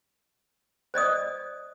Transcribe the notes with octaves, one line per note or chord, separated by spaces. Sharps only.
C5 D5 D#5 D#6